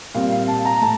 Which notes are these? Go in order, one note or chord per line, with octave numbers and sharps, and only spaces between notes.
A#2 G3 C4 F5
F5
A5
A#5
A2 A5